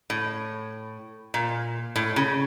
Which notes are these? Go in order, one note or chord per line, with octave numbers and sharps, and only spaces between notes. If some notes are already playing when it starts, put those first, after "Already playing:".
A2
A#2
A2
C#3